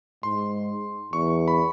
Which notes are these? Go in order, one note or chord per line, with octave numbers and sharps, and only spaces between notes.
G#2 C6
E2 C#6
B5